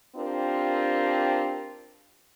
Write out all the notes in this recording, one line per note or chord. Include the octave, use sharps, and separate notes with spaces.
C4 D4 F4 G4 A#4